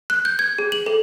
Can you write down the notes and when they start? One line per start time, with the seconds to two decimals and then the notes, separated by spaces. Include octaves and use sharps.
0.10 F#6
0.25 G6
0.39 G#6
0.58 G#4
0.72 F#7
0.86 A4